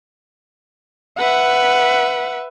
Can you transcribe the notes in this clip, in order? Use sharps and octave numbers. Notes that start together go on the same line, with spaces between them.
B4 E5 F#5